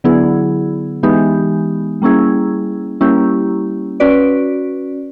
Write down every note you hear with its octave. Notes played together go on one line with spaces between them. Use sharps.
D3 F#3 B3 E4 G#4
E3 G#3 B3 D#4 G4
G3 A#3 C#4 E4 G#4
G3 A#3 C#4 E4 G4
C#4 F#4 B4 D5